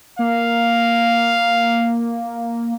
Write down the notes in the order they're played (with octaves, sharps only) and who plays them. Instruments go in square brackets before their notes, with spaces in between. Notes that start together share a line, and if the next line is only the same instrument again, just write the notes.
[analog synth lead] A#3 [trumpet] F5